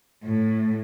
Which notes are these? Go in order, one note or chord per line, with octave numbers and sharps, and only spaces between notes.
A2